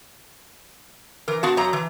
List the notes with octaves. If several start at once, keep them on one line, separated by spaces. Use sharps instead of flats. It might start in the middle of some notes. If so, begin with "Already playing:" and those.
E3 A#4
B3 F#4 F5 A5
F#2 F#3 A#5
E3